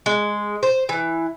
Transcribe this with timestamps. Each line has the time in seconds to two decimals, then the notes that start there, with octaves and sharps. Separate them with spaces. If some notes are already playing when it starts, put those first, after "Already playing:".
0.06 G#3
0.63 C5
0.89 E3